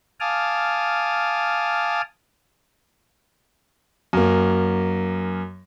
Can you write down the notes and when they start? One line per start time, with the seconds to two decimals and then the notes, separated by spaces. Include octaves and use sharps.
0.20 F5 G#5 A5 D6 D#6 F6
4.13 F#2 A#3